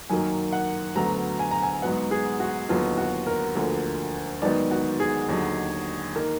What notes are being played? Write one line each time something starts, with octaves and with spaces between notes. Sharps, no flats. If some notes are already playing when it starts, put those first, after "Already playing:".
F#2 D#3 F#3 A#3 G#5
F#5
D2 D3 F#3 B3 A#5
G#5
A#5
G#5
G#2 F#3 B3 F#5
G#4
F#4
D#2 D3 F#3 B3 F4
F#4
A#4
D2 D3 F3 A#3
G#2 D#3 F#3 B3 D5
F#4
G#4
D#2 D3 F#3
D#3 A#3